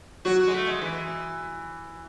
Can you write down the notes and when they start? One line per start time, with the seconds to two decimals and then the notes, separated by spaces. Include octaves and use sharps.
0.25 F#3 F#4
0.40 F#4
0.47 G#3
0.54 A3
0.67 G#3
0.82 E3